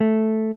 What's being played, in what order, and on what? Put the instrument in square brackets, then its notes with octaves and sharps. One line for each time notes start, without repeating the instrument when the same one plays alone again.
[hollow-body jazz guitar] A3